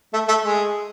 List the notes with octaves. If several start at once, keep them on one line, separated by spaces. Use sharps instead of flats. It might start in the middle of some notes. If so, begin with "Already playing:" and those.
A3
A3
G#3